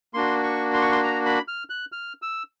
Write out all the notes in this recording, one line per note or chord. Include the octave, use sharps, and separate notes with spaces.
A#3 D4 F#4 C6
C#6
C6
C#6
C6
A#5
B5
F6
F#6
F6
E6